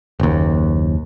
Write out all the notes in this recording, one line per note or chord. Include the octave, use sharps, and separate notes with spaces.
F#1 D#2